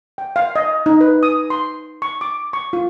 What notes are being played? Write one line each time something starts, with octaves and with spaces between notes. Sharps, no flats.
G5
F5
D#5
D#4
B4
D#6
C6
C#6
D6
C#6
F4